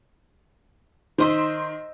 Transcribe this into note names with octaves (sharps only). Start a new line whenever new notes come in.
D#3 C5 D#5 E5 C6